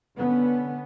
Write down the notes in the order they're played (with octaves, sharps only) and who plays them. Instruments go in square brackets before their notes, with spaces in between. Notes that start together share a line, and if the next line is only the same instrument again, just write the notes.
[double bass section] D3 B3 C#4